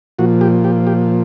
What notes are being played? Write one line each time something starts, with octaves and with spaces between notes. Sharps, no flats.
A#2 F3 F#4
G4
G4
G4